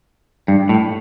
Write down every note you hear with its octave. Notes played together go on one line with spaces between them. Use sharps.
G2
A2